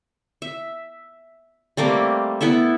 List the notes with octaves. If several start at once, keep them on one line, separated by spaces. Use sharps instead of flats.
E5
G3 A3 A#3 C4
B3 E4 A4 E5